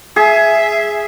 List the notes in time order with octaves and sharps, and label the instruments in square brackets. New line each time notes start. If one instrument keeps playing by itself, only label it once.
[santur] G#4 [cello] E5